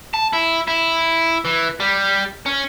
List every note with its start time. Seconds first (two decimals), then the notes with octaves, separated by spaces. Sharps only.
0.14 A5
0.33 E4
0.68 E4
1.45 E3
1.80 G3
2.46 C#4